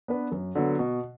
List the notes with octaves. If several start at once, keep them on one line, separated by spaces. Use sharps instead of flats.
B3 D4 B4
F#2
D3 F#3 B3
B2